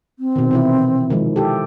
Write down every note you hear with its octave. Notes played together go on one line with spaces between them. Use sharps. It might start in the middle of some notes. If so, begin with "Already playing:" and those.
C4
B2 D#3
C3 E3 E4
D#3 F3 G#3
E4 G4 A4